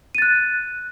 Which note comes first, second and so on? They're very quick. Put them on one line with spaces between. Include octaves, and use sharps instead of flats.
D#7 A6 F#6